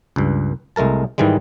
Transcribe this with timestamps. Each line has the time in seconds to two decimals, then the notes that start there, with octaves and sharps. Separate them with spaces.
0.16 C#2 G2
0.76 C2 G#3 A3 A#4 A5
1.18 G#2 D#3 E3 G3 G#3